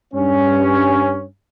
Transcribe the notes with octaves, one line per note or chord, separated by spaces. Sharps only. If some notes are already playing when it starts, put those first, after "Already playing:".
G2 C#4